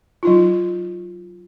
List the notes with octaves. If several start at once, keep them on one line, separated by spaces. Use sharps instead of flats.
F#3 D#4 F4